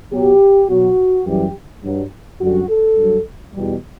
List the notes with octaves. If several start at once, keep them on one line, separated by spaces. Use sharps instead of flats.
B2 F#3 G4
B2 F#3 F#4
F#2 E3 G3 G4
G2 F#3
F#2 D3 G3 F#4
A4
G2 F#3
E2 B2 G3